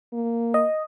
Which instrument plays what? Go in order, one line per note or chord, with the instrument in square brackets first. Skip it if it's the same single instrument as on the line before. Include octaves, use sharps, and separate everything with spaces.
[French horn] A#3
[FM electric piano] D#5